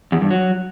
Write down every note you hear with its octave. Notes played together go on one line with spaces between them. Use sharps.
E2
G2
F#3